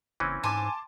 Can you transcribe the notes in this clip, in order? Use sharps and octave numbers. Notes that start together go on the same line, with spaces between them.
F#1 E3 C4 C#4
G#2 G#5 A5 C6 D6